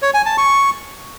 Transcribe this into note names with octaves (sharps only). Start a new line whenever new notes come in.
C#5
G#5
A5
C#6